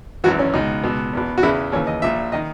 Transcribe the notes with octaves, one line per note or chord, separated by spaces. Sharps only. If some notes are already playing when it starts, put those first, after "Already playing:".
G#1 F#2 E3 F#4
C#4
C#2 B2 D#4
C#2 B2
E2 B2
F#4
E2 C#3 E3 E4
D#2 C#3 E3 C#5
D#5
A#1 A#2 E5
D#3 D#5